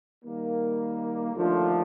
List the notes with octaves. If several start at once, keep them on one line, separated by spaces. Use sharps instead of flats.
D#3 G3 A#3
D#2 D3 F3 A3 D4